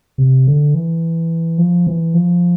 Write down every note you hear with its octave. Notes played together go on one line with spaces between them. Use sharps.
C3
D3
E3
F3
E3
F3